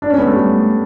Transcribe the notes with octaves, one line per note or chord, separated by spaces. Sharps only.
D4
C#4
B3
A3
G3